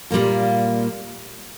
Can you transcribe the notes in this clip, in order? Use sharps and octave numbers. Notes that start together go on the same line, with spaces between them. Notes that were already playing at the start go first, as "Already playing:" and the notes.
A#2 G3 A#3 F4